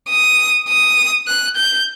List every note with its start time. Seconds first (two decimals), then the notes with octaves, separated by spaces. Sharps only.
0.09 D#6
0.68 D#6
1.27 F#6
1.57 G6